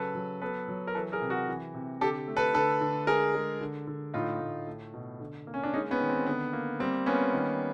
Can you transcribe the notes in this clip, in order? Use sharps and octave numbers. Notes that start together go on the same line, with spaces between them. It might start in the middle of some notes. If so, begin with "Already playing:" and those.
Already playing: C#3 F#3 A4 B4
F#3
B3 A4 B4
F#3
A#4
E3 A4 B4
G#4 A#4
C3
F#4 G#4
E3
C3
D3 G4 A4
A3
A4 B4
D3 A4 B4
D3
G#3 G#4 A#4
G#3
D3
D3
A2 D#4 F4
A2
A3
B2
D3
A#3
C#4
D4
G#3 C#4 D#4
B3 C#4
D#3
C4
D3 B3
A#3
G3 C4
A#3 B3 C#4
D#3